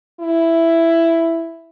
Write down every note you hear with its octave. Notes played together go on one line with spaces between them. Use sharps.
E4